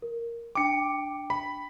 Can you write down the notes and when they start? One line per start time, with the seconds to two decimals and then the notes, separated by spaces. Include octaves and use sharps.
0.02 A#4
0.55 D4 G5 D6 C#7
1.30 B5